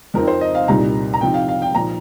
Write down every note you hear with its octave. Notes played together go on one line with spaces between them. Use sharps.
F2 F3 C4 D#4 A#4
C5
D#5
F5
C2 A#2 G3 D#4 A#5
A#5
C3 F3 D#4 G5
F5
F5
G5
A#2 F3 D#4 A#5